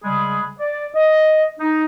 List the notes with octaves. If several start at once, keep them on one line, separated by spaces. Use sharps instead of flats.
C#3 G3 G#3 G#4 B5
D5
D#5
D#4